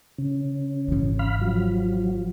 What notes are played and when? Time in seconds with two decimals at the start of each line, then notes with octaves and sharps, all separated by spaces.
0.18 C#3
0.88 G#1 E3
1.19 F5 B5
1.41 F3 F#3